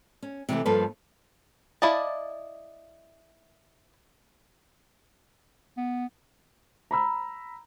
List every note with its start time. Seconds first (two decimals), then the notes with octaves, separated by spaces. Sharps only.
0.22 C#4
0.49 C3 E3 G3 A3
0.65 G2 F3 A#3 A4 B4
1.82 E4 D5 D#5 F5 A5
5.78 B3
6.91 A#5 B5 E6